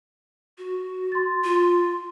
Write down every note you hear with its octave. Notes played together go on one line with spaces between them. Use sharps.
F#4
C6 A6
F4